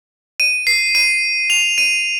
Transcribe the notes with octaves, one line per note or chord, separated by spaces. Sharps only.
D#7
C7
D#7
F7
D#7